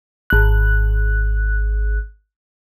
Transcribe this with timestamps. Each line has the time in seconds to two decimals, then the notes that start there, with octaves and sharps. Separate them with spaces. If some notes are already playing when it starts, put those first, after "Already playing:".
0.30 G#1 F#6